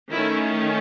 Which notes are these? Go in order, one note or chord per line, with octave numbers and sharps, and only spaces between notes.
D#3 A3 C#4 E4